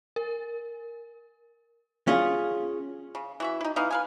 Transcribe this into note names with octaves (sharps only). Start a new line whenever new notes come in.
A#4
C#4 F4 G#4
C#3
E3 F#4 E5
D#4 E4
E3 B3 D#4 F5
B4 F5 G#5